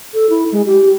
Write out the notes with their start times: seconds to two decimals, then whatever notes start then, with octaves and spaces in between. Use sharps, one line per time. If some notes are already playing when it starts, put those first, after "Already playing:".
0.14 A4
0.30 E4
0.52 G#3
0.66 G4